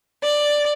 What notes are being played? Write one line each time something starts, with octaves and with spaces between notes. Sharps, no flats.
D5